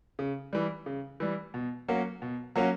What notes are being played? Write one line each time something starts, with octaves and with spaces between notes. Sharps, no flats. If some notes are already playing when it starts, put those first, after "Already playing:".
C#3
E3 G3
C#3
E3 G3
B2
F#3 A#3 C#4 F#4
B2
F#3 A#3 C#4 F#4